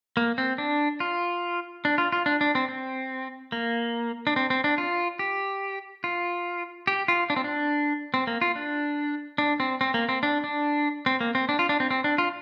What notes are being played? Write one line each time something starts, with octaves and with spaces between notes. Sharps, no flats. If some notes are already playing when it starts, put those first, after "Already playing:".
A#3
C4
D4
F4
D4
F4
F4
D4
D4
C4
C4
A#3
D4
C4
C4
D4
F4
G4
F4
G4
F4
D4
C4
D4
C4
A#3
F4
D4
D4
C4
C4
A#3
C4
D4
D4
C4
A#3
C4
D4
F4
D4
C4
C4
D4
F4